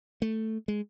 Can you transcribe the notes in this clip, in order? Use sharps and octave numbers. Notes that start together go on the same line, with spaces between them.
A3
G#3